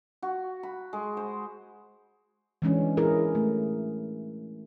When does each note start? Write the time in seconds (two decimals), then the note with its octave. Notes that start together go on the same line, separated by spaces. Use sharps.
0.22 F#4
0.63 B5
0.93 G#3
1.17 C5
2.62 E3 G#3 C#4 D4
2.97 E4 G#4 A#4
3.35 A3